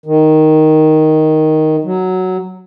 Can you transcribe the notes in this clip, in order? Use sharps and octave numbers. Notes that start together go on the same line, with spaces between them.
D#3
F#3